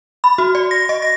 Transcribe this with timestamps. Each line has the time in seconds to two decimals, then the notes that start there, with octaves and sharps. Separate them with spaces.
0.24 B5
0.38 F#4
0.55 D5
0.71 A#6
0.89 D#5
1.02 A#6